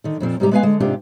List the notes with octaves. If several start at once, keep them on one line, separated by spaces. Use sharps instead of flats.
D3 D#3
F2 A#2 F3 C4
G#2 C3 G3 F#4 G4 A#5
G#3 B3 B4 E5 F5 G#5
D3 G#3
G#2 C3 D4 F4 G4